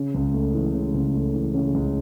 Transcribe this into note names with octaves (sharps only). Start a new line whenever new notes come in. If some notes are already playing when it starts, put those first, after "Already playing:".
Already playing: C#3
C#2
A3
E3
C#3
C#2
A3
E3
C#3
C#2